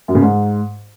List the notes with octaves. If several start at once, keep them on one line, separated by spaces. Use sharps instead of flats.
F#2
C#3
G#2